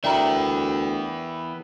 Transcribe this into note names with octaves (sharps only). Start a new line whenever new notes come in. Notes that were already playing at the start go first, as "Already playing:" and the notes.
D2 E3 B3 E4 A#4 D5 G5